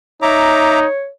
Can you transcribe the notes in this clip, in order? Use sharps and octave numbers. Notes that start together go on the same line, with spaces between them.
D#4 C#5 E5 A#5 D6